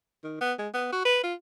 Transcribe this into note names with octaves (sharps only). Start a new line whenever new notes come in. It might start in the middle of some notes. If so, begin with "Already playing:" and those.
D#3
B3
G#3
B3
F#4
B4
F4